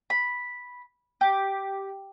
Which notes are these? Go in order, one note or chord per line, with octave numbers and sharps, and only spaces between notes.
B5
G4